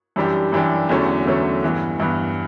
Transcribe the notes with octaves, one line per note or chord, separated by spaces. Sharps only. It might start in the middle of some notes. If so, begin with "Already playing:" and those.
F#2 E3 G3 D4 G4
F#2 E3 G3 D4 G4
E2 D3 F#3 A3 C#4
E2 D3 F#3 A3 C#4
G2 E3 B3
G2 E3 B3